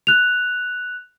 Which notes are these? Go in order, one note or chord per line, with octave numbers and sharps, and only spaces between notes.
F#6 F7